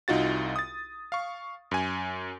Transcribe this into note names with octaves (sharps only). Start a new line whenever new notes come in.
C2 D#4 F4 F#4 A6
D#6 A6
F5 C#6
F#2 G#5